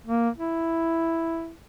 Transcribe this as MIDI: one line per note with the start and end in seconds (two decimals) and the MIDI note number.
0.07 0.29 58
0.38 1.53 64